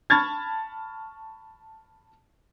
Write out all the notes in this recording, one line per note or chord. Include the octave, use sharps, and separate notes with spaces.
A5 B5 C#6 F6 G#6 A6